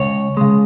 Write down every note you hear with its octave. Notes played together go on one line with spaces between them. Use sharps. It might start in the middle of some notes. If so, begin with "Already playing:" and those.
Already playing: C#2 C#5
C#3 G#3